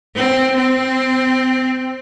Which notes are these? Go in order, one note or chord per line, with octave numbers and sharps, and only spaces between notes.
C4
C4